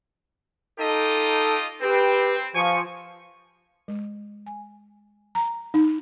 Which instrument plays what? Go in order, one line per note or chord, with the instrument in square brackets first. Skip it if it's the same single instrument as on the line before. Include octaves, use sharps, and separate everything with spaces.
[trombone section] D#4 A4 [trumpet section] F4 G4 D#5
[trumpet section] C4 [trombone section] G4 B4
[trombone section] F3 [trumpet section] G#5 C#6
[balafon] G#3
G#5
A#5
D#4